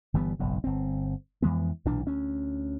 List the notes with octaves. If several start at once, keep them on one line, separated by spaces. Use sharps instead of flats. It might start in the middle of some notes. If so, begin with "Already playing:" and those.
G1 E3 G3 B3
F#1 B1 G#2
G1 C4
F2 E3 G#3 B3
B1 A#2 E3 D4
D2 C#4